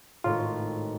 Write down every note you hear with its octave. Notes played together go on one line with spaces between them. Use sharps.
G#1 A2 F4